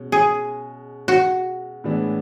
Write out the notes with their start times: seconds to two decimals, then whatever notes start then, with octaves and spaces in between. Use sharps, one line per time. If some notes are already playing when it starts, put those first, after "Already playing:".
Already playing: B2 G#3 C#4
0.12 G#4
1.08 F#4
1.84 A2 E3 G#3 B3 D4